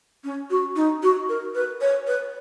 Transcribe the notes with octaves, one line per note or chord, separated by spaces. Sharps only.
C#4
F#4
D#4
F#4
A#4
B4
C#5
B4